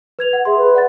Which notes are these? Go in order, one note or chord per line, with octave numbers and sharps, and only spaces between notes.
B4 G#6 F7
F#5
G#4 E5 C6
B4
D5 F#5 A6